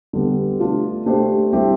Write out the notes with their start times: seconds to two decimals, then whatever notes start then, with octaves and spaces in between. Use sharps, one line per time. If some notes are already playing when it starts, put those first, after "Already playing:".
0.13 D3 G3 B3
0.60 A3 D4 F4
1.06 A3 D4 G4 C5
1.53 G3 C4 E4 G4 C5